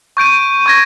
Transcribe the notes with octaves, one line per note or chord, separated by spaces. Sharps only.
C#6 G6 D7 D#7
C#6 G#6 A#6